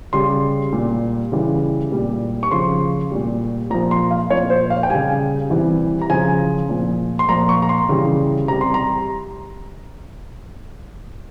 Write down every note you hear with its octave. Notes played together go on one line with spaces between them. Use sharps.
C#3 G3 C6
A#2 G3
C#3 E3 G3
A#2 G3
C#6
C#3 F3 C6
A#2 G3
A#2 F3 A#5
C6
F5
A#2 F3 C#5
C5
F5
G5
C#3 G3 G#5
C3 E3 G3
A#5
C#3 F3 G#5
A#2 F3
C6
A#2 F3 A#5
C#6
A#5
C6
C#3 E3 G3
C3 G3 A#5
C6
A#5